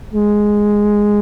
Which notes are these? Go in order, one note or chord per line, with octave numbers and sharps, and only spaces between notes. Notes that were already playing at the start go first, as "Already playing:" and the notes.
G#3